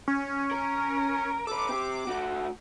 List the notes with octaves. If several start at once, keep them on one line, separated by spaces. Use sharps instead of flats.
C#4
A#4
A4 B4 D6
C4 G4
A3 F#4